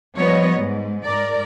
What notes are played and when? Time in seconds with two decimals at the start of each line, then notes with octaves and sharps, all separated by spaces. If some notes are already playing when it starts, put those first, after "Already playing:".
0.16 F3 G3 B3 D#4 C#5 D#5
0.59 G#2
1.05 G#2 A#4 D5